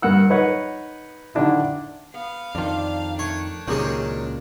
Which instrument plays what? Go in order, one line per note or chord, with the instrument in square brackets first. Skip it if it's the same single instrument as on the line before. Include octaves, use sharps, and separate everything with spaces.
[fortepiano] G2 A#4 F#5 E6
D#4 B4 C#5 F#5
D3 D#3 D4 E4
[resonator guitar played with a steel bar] B3 [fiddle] F5
[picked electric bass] F2 D#3 [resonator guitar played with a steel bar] D4 F4
[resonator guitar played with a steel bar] A3 [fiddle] D4 [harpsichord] C#5
[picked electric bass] C#2 A#2 [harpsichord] D#3 F#3 C#4 [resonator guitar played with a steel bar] C4 G4 G#4